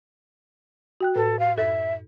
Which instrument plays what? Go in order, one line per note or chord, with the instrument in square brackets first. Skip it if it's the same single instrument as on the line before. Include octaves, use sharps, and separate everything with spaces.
[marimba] F#4 G5 F#6
[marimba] A2 B4 [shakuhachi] A4
[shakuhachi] F5
[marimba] F#2 A4 A6 [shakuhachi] E5